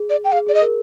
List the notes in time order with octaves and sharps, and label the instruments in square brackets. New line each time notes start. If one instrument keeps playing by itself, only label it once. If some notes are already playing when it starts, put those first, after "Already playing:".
Already playing: [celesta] G#4
[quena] D5
G5
[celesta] G#4 [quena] F5
[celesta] G#4 [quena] D5
[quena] D#5
[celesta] A#4